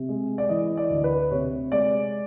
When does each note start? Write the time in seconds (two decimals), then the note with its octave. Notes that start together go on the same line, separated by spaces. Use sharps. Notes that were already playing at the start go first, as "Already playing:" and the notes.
Already playing: C3
0.09 G#3
0.38 D5
0.49 E3 D#5
0.77 D5
0.90 D2
1.04 B4
1.31 C3 C#5
1.72 G#3 D5